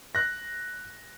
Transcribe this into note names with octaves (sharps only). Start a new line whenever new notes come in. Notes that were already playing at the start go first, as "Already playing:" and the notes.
F#6 A#6